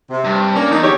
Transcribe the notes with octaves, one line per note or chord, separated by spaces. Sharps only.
C3
G2
A#3 C#4 D4 D5
E2 D#4
D3 G4 C#5